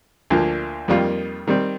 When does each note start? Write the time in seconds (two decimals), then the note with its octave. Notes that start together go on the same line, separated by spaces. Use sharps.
0.30 D2 D3 F3 A#3
0.88 F2 D#3 G3 A#3 F4
1.47 D#3 G3 C4